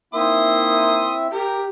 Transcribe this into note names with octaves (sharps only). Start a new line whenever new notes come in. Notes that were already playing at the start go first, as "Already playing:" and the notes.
A#3 C4 D#4 E4 E5 C6 D#6
G4 A#4